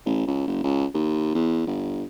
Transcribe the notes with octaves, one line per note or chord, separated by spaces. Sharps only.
A1
C#2
F#1
C#2
D#2
E2
G1